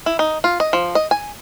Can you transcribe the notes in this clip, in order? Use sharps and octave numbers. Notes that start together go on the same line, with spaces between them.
E4
D#4
F4
D#5
F3
D#5
G#5